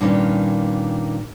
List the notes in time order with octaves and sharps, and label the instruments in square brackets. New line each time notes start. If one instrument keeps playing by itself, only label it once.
[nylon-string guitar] G2 A#2 D#3 C#4